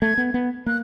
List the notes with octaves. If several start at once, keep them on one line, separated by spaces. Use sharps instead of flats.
A3 G#6
B3
B3
A#3 F#6